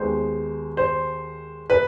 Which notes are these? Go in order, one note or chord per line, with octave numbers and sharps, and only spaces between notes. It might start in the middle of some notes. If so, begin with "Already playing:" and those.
Already playing: D#2 D#3 G#3 B3 C5
C5
B4